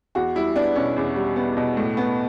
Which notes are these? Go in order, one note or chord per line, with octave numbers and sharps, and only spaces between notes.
E2 F#4
G3 E4
B3 D4
B2 C#4
E2
G3
B3
B2
A2
B3